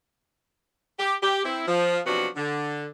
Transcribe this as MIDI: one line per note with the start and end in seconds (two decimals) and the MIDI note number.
0.99 1.15 67
1.23 1.41 67
1.45 1.62 60
1.45 1.62 64
1.67 1.99 53
2.06 2.27 48
2.06 2.27 53
2.06 2.27 54
2.06 2.27 59
2.06 2.27 62
2.06 2.27 66
2.36 2.86 50